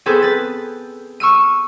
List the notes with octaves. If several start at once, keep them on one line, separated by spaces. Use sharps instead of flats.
B3 C4 G#4 A4 B4 C5
B4 A6
C#6 E6 F6 D#7